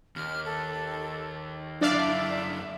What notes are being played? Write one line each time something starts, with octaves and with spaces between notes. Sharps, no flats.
D#2 F6
A4
F#2 D4 E4 D5 E5 F5